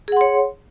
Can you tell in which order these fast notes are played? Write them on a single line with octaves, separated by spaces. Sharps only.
G#4 F#5 C6 C#5